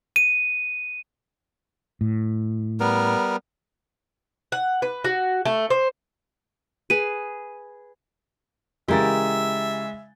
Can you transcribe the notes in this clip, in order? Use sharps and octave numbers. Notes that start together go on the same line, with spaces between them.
D#7
A2
G3 B3 A#4
F#5
B4
F#4
A3
C5
G#4 B4 D#7
C#3 E3 G#3 G4 A#4 E5 A6